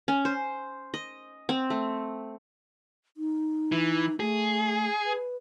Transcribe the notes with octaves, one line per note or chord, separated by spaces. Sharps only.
C#4
C5
D#5
C4
A3
D#4
E3
A3 G#4
B4